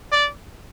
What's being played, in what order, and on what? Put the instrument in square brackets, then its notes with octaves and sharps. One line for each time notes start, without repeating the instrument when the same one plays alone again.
[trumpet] D5